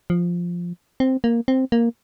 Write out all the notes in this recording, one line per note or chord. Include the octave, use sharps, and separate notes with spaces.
F3
C4
A#3
C4
A#3